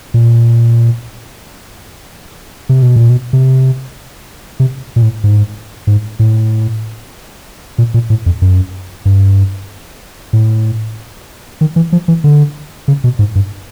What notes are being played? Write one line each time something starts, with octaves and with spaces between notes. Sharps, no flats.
A#2
C3
B2
A#2
B2
C3
C3
A#2
A2
G#2
G#2
A2
A#2
A#2
A2
F2
F#2
G2
A2
D#3
E3
F3
E3
D3
C#3
B2
G#2
G2